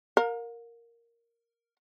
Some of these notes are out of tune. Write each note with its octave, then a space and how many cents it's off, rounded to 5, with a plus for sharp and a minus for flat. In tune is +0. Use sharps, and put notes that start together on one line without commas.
A#4 +0 F5 +45